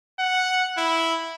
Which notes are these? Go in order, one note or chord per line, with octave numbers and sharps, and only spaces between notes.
F#5
E4